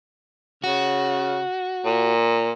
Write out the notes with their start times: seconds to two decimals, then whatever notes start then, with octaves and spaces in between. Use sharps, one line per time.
0.64 C#3 F#4
1.85 A#2